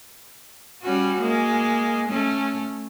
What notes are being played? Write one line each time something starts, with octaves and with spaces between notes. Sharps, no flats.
G3 C#4 F#4
G#3 A#3
A3 C#4